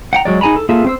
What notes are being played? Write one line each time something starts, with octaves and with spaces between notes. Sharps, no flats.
F#5 G5 A#5
F#3 G#3 D5
D#4 G#4 G#5 A#5 B5
A4
A#3 F4 G#4 A4 E5
C4 C5 E6